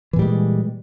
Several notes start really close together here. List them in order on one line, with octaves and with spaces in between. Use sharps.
E3 A#2 G3 G#3